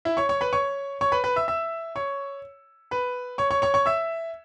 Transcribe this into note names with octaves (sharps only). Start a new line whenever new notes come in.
E4 E5
C#5 C#6
C#5 C#6
B4 B5
C#5 C#6
C#5 C#6
B4 B5
B4 B5
E5 E6
E5 E6
C#5 C#6
B4 B5
C#5 C#6
C#5 C#6
C#5 C#6
C#5 C#6
E5 E6